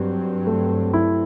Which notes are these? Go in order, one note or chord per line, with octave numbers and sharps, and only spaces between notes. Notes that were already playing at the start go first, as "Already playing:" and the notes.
Already playing: G2 F#3 G3 C4
A3
E4